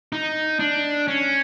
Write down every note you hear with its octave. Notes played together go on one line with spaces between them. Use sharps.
D#4
D4
C#4